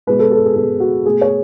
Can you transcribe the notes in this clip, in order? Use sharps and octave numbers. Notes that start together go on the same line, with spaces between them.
B2 G#3 B4
A4
A4
G#4
B2 G#3 G#4
F#4
B2 A3 G#4
C#5